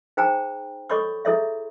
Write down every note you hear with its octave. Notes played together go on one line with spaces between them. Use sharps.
D#4 G#4 C5 G5 G#5 A#5
A4 C#5 D#5 B5 C#6 D6
E4 G#4 A4 C#5 D#5 E5